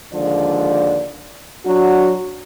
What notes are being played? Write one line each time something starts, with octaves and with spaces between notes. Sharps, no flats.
D#2 D3 F3 G#3 D5
F#3 D4 F#4